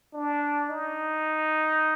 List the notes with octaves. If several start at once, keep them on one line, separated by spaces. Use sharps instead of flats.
D4
D#4